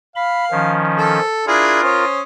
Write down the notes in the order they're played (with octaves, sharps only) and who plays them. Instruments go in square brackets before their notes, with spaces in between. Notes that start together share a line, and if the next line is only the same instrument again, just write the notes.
[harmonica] F5 [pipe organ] B5
[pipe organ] D#3 F3 C#4
[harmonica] A4
[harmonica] D4 E4 G#4 [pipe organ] F4 A#4
[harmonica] C#4 C5 D#6